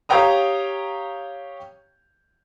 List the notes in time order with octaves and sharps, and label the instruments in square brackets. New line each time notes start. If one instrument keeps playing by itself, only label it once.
[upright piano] G4 C#5 F5 G5 A#5 D#6